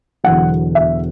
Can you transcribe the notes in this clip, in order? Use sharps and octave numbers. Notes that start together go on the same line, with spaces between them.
E1 E2 D3 F#3 F#5
E5